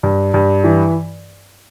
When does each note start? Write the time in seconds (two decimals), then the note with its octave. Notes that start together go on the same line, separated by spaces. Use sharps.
0.03 G2
0.34 G2
0.64 E3